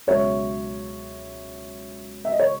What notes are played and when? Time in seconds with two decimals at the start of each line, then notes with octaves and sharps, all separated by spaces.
0.07 C#2 B2 F#3 C#5 E5
2.25 E5
2.32 D#5
2.39 C#5